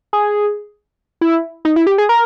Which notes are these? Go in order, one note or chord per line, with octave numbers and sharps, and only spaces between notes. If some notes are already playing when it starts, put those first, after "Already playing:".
G#4
E4
D#4
E4
G4
G#4
A#4